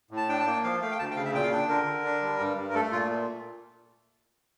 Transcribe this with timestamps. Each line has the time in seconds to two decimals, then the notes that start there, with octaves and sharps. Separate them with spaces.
0.11 A2
0.17 A5
0.29 D4 G5
0.40 A5
0.46 A#3 G5
0.64 F3 F5
0.81 A3 F5
0.91 G5
0.99 D2 A5
1.11 G5
1.16 C#3 F5
1.25 E5
1.34 A#2 G5
1.43 F5
1.52 D4 G5
1.69 D3 A#4
1.87 D3
2.05 D4
2.22 G3
2.39 G2
2.57 G2
2.69 A#4
2.75 A3 A4
2.92 A#2 F4